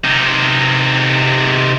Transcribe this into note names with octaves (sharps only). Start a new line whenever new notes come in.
C3 D#4